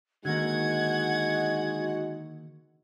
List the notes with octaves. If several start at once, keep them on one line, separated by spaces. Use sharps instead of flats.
D3 D#3 G#3 A#3 D#4 F#4 F#5 G#6